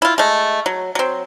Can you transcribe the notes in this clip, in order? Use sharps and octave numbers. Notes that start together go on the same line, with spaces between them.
E4 F4
G#3 A3
F#3
F#3 C4